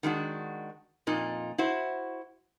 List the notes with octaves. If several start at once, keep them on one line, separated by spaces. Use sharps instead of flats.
D#3 G#3 D4 F#4
F2 A#2 D#4
E4 F#4 C5